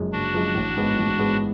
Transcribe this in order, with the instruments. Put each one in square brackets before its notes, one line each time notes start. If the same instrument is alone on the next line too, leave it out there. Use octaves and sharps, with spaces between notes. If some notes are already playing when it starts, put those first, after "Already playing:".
Already playing: [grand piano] F#1 F#2 F3 G#3
[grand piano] F#1 [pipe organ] D4 F#4
[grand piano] F#2 F3 G#3
A1
G#2 G#3 B3
A1
G#2 G#3 B3